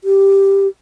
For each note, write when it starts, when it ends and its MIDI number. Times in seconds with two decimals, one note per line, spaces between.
0.04 0.68 67